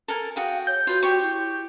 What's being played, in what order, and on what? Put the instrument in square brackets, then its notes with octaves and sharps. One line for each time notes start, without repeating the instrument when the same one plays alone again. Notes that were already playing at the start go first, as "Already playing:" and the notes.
[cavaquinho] A4 A#4 G#5
[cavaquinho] F#4 G#4 G5 [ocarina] F5
[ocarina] C#5 [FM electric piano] G6
[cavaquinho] F4 B4 [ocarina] F#4
[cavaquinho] G4 C#5 C#6
[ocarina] E4